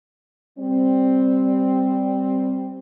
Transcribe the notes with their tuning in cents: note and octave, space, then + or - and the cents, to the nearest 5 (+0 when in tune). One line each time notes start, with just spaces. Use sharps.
G3 +0 C4 +0 D5 +0